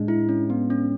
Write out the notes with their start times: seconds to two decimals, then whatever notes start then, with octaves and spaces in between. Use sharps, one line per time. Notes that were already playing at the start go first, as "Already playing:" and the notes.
Already playing: A2 G#3 D4
0.08 E4
0.29 C#4
0.50 B3
0.70 C#4